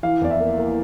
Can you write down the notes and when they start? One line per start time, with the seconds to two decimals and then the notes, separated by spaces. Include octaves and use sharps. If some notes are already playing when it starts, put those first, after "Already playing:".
0.03 E3 F5
0.22 E2 D5
0.31 E5
0.40 A#3
0.58 A#3